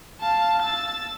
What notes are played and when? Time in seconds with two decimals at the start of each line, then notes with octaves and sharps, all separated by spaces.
0.20 F5 A5
0.62 E6 A6